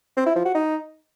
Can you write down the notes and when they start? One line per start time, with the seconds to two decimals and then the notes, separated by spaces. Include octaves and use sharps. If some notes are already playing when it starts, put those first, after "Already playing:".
0.17 C4
0.26 E4
0.36 F3
0.45 F#4
0.55 D#4